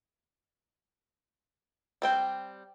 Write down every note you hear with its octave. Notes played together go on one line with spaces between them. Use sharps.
G3 C4 G5